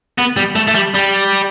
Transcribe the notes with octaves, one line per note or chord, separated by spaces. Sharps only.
B3
G3
A3
A3
G3
G3